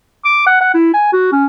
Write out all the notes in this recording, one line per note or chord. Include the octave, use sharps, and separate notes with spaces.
D6
F#5
F#5
E4
G#5
F#4
C#4